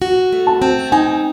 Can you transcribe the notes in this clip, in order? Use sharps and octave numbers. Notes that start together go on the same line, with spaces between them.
F#4
A3
A5
C4
D#4 G#5